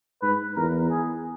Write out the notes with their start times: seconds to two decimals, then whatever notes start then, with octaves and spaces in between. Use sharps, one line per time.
0.22 G#2 B4
0.56 E2 A#4
0.91 G#4